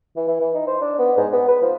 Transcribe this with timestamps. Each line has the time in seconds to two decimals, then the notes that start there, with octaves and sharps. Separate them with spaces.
0.16 E3
0.28 E3
0.40 E3
0.54 D#4
0.67 C5
0.81 D4
0.99 B3
1.17 G#2
1.33 B3
1.48 B4
1.62 F3